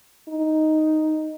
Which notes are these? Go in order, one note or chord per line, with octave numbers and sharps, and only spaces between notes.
D#4